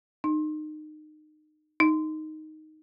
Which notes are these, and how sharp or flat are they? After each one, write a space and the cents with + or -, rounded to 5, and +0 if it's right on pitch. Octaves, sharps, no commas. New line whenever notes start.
D#4 -25
D#4 +0